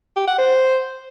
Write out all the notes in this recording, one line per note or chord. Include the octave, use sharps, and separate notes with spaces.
G4
F#5
C5